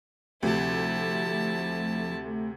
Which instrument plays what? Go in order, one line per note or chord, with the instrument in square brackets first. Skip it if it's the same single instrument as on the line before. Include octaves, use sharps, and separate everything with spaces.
[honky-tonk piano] D2 C3 [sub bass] F3 [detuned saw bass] A3 [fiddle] E4 A5